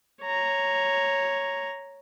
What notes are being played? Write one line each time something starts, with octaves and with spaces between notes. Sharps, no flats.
C#5 A#5